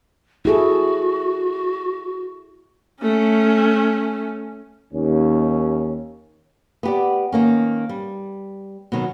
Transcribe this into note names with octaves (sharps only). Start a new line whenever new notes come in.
E4 F#4 G#4 A4
A3 C#4
D#2 C#4
B3 G4 D5
D#3 A#3 C#4
G3
B2 D#3 F#3